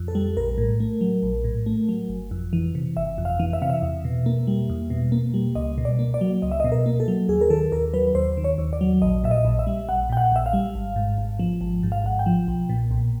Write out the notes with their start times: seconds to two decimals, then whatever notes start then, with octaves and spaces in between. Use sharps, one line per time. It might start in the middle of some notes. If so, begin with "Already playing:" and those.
Already playing: F2
0.08 A4
0.15 G3
0.37 A#1 A#4
0.58 A2
0.80 A3
1.01 F#3
1.23 A#1
1.44 A2
1.66 A3
1.89 F#3
2.09 G1
2.31 F2
2.53 E3
2.75 C3
2.97 G1 E5
3.18 F2
3.25 F5
3.40 E3
3.53 E5
3.62 C3 F5
3.70 E5
3.82 E2
4.05 B2
4.26 A#3
4.47 G3
4.70 E2
4.90 B2
5.12 A#3
5.34 G3
5.55 C#2 D#5
5.78 B2
5.85 D5
5.99 A#3
6.14 D5
6.21 F#3
6.42 C#2 D#5
6.52 E5
6.60 D#5
6.64 B2
6.72 A#4
6.86 A#3
7.00 A4
7.08 F#3
7.29 D#2 G#4
7.41 A#4
7.50 D#3 A4
7.72 D#2 A#4
7.94 F#3 B4
8.15 D#2 C5
8.37 D#3
8.44 C#5
8.58 D#2
8.73 D5
8.81 F#3
9.02 A#1 D#5
9.24 A#2 E5
9.31 D#5
9.45 A#1
9.59 E5
9.67 G3
9.89 A#1 F#5
10.09 A#2 G5
10.17 F#5
10.32 A#1 E5
10.46 F5
10.53 G3
10.75 G#1
10.96 G#2
11.18 G#1
11.39 F3
11.61 G#1
11.83 G#2
11.92 F5
12.04 G#1 F#5
12.19 G5
12.26 F3
12.48 B1
12.69 A#2
12.91 B1